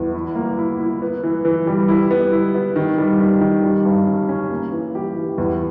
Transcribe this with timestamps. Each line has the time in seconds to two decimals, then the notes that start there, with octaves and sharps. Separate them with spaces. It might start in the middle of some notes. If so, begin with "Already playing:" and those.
Already playing: E2
0.14 E4
0.35 A#3
0.58 E4
0.79 E4
1.02 B3
1.23 E3
1.45 E3
1.67 G3
1.88 E4
2.11 B3
2.32 E4
2.54 B3
2.76 D#3
2.98 G3
3.20 D#3
3.41 D#3
3.64 G3
3.85 G2
4.07 C#4
4.29 C#4
4.51 A#3
4.72 E3
4.95 G4
5.16 E3
5.38 E2